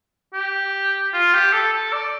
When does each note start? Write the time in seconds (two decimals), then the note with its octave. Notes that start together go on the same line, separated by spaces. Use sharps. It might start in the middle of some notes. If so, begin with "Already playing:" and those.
0.34 G4
1.13 F4
1.33 G4
1.53 A4
1.73 A4
1.92 D5